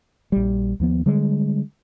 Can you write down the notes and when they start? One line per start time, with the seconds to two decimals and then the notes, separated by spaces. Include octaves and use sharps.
0.32 A#1 G3
0.80 D#2 F3 B3
1.06 D3 G3 G#3